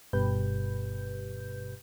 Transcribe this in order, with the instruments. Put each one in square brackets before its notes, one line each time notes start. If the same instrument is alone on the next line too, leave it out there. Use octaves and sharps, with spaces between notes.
[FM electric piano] G1 G2 B2 G4 B4 G6